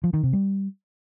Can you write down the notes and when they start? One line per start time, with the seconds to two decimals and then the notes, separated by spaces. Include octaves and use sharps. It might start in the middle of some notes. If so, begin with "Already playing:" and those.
0.04 F3
0.14 D#3
0.23 C3
0.33 G3